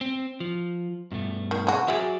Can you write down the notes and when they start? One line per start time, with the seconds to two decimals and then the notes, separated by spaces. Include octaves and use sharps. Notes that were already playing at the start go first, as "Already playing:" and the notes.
0.01 C4
0.40 F3
1.12 G2 B2 A3
1.51 D#3
1.67 G#3 F#4
1.88 F#3 F#4 G#4 D5 E5